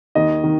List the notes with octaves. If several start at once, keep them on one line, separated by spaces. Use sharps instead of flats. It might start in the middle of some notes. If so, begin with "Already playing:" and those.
D#2 D#5
D#3